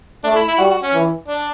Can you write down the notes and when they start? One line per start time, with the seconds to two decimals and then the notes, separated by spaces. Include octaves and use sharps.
0.24 A3 D4
0.36 E4
0.48 E4
0.58 G3 F#4
0.70 F#4
0.82 C#4
0.94 E3
1.28 D4